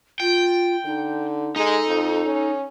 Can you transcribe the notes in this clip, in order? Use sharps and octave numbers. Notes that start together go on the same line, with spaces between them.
F4 G5
D3 D#4
G#3 D#4 A4
F2
C#4